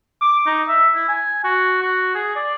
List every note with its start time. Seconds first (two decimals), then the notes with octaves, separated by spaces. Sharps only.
0.22 D6
0.46 D#4
0.68 E5
0.95 E4
1.08 G#5
1.44 F#4
1.81 F#4
2.15 G#4
2.35 D5